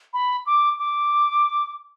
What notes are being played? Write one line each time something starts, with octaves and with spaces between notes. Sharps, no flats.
B5
D6
D6